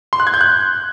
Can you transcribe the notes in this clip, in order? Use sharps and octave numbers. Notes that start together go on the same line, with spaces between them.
C6
F#6
G#6
G6
F#6